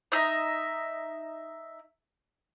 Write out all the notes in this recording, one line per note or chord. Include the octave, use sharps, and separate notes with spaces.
D#4 E5